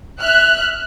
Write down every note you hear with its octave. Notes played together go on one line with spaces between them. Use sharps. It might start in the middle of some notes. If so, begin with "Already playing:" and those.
E5 F6 F#6